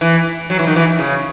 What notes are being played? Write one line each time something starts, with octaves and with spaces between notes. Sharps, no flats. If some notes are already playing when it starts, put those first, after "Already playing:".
E3
F#3
E3
D#3
E3
C#3